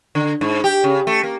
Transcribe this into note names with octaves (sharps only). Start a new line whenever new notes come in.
D3
G#2
G4
C#3
A3
A#3